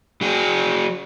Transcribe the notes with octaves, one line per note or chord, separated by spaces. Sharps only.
F#3 G#4